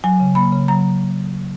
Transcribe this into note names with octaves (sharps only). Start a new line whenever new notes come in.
F#3 G#5
C#3
A#3 B5
C#3
F#3 A#5